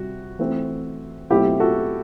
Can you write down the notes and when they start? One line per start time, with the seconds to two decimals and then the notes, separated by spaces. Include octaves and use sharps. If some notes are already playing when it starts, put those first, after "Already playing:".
Already playing: C3 G3 F#4
0.39 E3 A3 C4
1.30 B2 F#3 A3 C4 E4 G4
1.60 F#4 A4